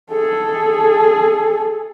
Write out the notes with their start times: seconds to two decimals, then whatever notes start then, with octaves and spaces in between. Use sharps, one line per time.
0.12 G#4 A4